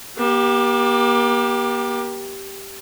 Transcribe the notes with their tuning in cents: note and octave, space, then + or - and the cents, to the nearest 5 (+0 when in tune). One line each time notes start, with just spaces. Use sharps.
A#3 +40 G4 +0